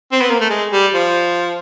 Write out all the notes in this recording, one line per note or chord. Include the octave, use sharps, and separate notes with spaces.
C4
B3
A#3
A3
G#3
G3
F3